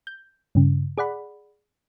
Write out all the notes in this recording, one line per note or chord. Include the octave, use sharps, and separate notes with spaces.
G6
G2 C#3
G#4 D5 F#5 B5